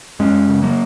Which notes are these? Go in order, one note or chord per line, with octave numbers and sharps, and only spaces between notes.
F#2 G#3 C#4
C#3
F#3 A#3